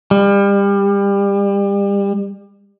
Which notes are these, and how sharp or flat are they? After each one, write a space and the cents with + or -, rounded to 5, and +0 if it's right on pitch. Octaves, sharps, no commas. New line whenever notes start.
G3 +30